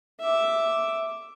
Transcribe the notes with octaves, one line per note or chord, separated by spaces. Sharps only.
E5 D6